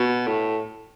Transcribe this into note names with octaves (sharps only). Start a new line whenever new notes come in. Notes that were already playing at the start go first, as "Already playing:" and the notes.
Already playing: B2
A2